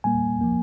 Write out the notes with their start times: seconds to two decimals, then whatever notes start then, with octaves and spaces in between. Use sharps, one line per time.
0.04 A#2 G3 A#3 G#5
0.41 F3 A#3